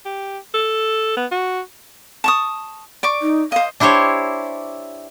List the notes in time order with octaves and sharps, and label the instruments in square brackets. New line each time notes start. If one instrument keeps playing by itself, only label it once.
[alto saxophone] G4
A4
B3
F#4
[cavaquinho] A5 C#6 D#6
D5 C#6 D6
[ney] D#4
[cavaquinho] C5 D#5 [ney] F5
[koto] D4 E4 G4 C5 C#5